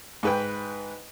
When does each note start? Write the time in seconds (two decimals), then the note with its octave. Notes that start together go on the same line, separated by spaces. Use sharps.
0.23 G#2 B4 G5